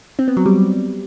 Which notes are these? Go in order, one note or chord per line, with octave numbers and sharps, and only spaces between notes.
C4
B3
F#3
G3